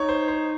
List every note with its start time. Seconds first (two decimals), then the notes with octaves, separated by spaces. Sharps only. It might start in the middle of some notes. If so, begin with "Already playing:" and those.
Already playing: D#4 C#5
0.09 C5
0.28 C5